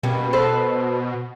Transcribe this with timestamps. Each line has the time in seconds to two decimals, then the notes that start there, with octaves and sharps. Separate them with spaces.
0.03 B2 G3 A#3 C#4
0.33 A4 B4 C5